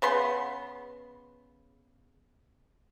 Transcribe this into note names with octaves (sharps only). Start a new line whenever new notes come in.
C#3 B3 C6